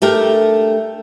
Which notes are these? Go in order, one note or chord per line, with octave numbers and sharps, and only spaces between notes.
A3 D4 G4 A4 A#4